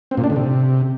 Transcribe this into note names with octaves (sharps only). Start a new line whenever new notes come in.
C4
A#2
D4
D3
C3